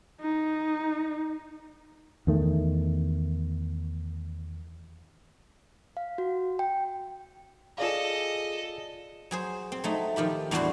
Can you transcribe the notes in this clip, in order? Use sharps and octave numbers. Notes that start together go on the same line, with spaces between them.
D#4
E2 D#3 A3
F5
F#4
G5
F4 G#4 A4 D5 D#5 F5
F#3 G#4 C5
C4
F#3 A3 D#4
D#3 F3 G4 B5
E2 A2 G3 D4 F#4 C6